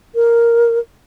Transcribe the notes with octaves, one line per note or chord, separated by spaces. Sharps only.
A#4